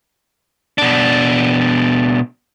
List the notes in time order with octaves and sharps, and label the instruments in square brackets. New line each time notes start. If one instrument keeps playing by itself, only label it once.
[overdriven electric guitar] B2 D4